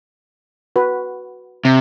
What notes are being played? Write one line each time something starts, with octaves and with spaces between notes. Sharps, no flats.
F#4 B4
C3